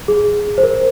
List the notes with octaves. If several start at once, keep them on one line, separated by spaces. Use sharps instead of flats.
G#4
C5
A#4